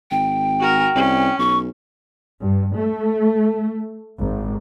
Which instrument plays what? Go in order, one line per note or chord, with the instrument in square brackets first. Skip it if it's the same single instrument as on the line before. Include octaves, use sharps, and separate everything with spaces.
[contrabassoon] G#1 [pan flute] G5
[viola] F#4 A#4
[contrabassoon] C2 [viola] C#4
[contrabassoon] B1 [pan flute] C#6
[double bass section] G2
A3
G#1